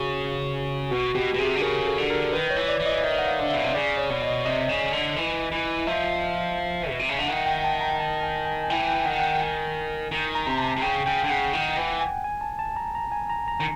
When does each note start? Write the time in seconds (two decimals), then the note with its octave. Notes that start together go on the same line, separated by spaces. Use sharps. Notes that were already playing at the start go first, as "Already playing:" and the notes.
Already playing: C#3 F#4
0.91 B2 F#4
1.15 B2 G4
1.34 B2
1.38 C3 G#4
1.56 D3
1.62 C#3 A#4
1.86 A4
1.98 D3
2.10 A#4
2.33 D#3 B4
2.50 C#5
2.56 E3
2.68 D5
2.80 E3
2.86 D#5
3.03 D#3 E5
3.18 F#5
3.27 F5
3.39 D3
3.50 B2 E5
3.64 C3
3.75 C#3 D5
3.98 C#5
4.10 B2
4.22 D#5
4.45 C3 D#5
4.69 C#3
4.93 D3
5.16 E3
5.52 E3
5.87 F3 E5
6.89 B2
6.99 C3
7.09 C#3
7.19 D3
7.28 D#3 F#5
7.46 G5
7.64 A5
7.81 A#5
8.00 A5
8.23 G#5
8.46 G#5
8.64 G#5
8.70 E3 G5
8.88 G5
9.05 D#3 F#5
9.19 F#5
9.23 G5
9.41 G#5
10.11 D#3
10.35 A#5
10.46 C3
10.58 A5
10.77 C3
10.82 C#3 G5
11.06 C#3 G5
11.24 D3
11.29 C#3 F#5
11.53 D#3
11.77 E3
12.01 G#5
12.24 G#5
12.41 A5
12.59 A5
12.77 A#5
12.95 A#5
13.12 G#5
13.30 A#5
13.48 A#5
13.60 D#3